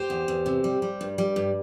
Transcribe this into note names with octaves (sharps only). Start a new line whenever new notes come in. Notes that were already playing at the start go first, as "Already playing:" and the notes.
Already playing: G4 C5
E2
E2
C3
G3
G3
G2
G3
G2